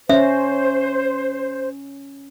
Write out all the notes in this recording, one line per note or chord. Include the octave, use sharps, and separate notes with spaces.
C#4 C5 E5